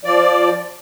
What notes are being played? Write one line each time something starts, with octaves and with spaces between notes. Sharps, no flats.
F3 D5